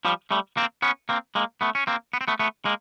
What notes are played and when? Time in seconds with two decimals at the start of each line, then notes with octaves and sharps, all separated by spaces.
0.05 F3 G3
0.31 G3 A3
0.57 A#3 C4
0.82 B3 C#4
1.09 A#3 C4
1.35 G#3 A#3
1.61 A3 B3
1.75 C#4
1.87 A#3 C4
2.13 B3
2.21 C4
2.28 A3 B3
2.39 A3 B3
2.65 G#3 A#3